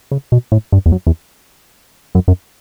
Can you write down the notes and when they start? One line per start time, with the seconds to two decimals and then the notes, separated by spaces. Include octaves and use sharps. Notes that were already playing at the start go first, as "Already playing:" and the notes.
0.11 C#3
0.32 B2
0.52 A2
0.72 G2
0.86 E2
0.92 F#2
1.07 E2
2.15 F#2
2.28 F#2